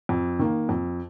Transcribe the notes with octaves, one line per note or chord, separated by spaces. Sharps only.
F2
D#3 A#3
F2